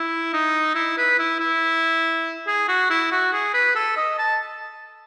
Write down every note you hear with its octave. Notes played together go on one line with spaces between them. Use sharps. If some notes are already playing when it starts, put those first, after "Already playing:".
Already playing: E4
D#4
E4
B4
E4
E4
G#4
F#4
E4
F#4
G#4
B4
A4
D#5
A5